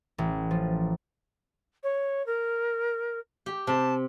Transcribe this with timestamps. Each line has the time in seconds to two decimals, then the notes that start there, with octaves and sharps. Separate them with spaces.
0.18 A1
0.51 F3
1.83 C#5
2.26 A#4
3.46 G4
3.67 C3 A5